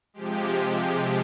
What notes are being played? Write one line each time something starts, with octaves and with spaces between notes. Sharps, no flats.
C3 F3 G#3 G4